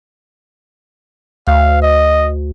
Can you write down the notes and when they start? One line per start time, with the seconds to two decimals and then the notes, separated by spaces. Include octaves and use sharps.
1.47 D2 F5
1.82 D#5